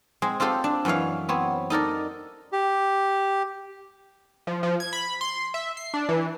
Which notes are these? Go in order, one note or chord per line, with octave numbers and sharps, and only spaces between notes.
G#3 C4 G#4
C4 F4 G4 A4 C5
D4
F#2 E3 C#5 F5
B3 C4 C#5
D#4 A4 A#4 D5
G4
F3
F3
G#6
B5
C6
E5
C7
D4
E3